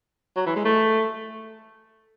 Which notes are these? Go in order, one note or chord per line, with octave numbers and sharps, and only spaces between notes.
F#3
E3
G#3
A3